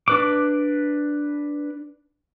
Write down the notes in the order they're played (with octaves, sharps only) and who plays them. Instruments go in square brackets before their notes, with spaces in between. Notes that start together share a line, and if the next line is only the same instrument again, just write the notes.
[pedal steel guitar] D4 B4 D6